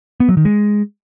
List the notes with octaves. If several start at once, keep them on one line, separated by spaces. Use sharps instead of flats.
B3
F#3
D#3
G#3